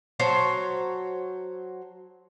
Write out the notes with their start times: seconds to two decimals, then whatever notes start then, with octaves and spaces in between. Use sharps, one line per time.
0.20 F#3 C5 C#5 A5